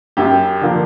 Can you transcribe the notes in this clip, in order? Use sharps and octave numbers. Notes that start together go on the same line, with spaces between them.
F#2 G4
D3 F3 A#3 D4